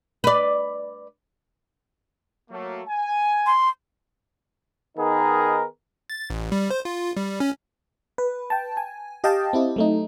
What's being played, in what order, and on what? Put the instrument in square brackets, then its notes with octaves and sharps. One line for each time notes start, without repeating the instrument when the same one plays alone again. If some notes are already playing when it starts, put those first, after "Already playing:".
[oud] B4 D5
[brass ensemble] F#3 A3 A#3
G#5
[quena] C6
[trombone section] D#3 B3 D#4 G#4 A#4
[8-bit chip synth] A6
A1
G3
C5
F4
G3
C#4
[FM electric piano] B4
G5 A5
G#5
G4 D#5 F5 G5 A5
C4 E4 G4
F#3 A3 D#4